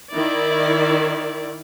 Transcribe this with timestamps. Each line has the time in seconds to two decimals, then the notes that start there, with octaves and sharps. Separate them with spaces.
0.12 D#3 E4 D5